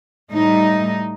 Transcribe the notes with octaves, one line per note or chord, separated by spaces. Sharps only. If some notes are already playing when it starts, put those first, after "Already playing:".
A2 G3 D#4